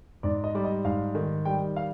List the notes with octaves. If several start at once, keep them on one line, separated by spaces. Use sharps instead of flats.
G#2 D5
D#5
G3 D5
D#5
G#2 F5
D#3
G3 G5
F5